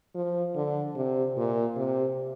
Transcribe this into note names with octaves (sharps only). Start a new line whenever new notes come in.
F3
D3
C3
A#2
C3